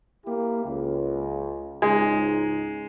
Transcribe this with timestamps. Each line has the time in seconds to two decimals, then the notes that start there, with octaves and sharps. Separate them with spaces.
0.24 A#3 E4 G4
0.64 C#2
1.82 C#2 G#2 G#3 D#4